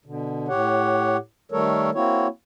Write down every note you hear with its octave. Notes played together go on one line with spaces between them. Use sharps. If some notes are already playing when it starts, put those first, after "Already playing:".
B2 D3
A2 G4 C#5 F#5
D#3 G3 A3 A4 A#4 C#5
A#3 C4 E4 F#4 C#5